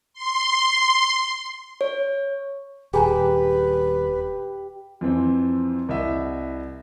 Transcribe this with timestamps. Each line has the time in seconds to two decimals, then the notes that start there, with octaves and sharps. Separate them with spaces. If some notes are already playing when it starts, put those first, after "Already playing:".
0.13 C6
1.81 C#5
2.93 D#1 G4 G#4 B4 G#5 A#5
5.01 F2 E3 C4
5.89 C2 E4 D#5 E5 F#5